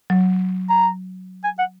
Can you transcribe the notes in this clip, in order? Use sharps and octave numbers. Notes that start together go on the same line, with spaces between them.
F#3
A#5
G#5
F#5